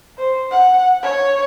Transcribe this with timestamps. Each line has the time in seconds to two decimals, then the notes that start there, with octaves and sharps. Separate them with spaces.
0.18 C5
0.51 F#5
1.03 C#5